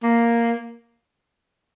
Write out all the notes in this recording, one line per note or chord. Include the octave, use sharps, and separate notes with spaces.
A#3